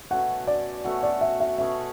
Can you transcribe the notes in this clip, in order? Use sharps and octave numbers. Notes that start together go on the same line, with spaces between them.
B2 A3 C#4 F#4 F#5
D5
B2 A3 C#4 F#4 F#5
D5
E5
E5
B2 A3 C#4 G#4 E5